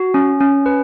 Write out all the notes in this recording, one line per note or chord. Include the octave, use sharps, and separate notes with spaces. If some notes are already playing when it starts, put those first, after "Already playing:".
Already playing: F#4
C#4
C#4
B4